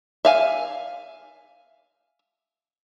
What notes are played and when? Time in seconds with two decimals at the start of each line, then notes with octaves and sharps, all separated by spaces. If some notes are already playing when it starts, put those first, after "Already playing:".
0.25 E5 F5 G#5